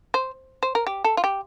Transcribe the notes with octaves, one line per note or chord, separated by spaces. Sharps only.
C5
C5
A#4
G4
A4
F4
G4